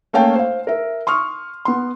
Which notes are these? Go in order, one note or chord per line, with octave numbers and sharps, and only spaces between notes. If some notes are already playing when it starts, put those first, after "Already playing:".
A3 A#3 C#4 F5 G5 A5
C5 F5
A#4 E5
C6 C#6 D#6 F6
B3 C6